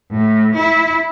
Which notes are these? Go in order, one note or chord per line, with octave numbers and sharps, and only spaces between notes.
A2
E4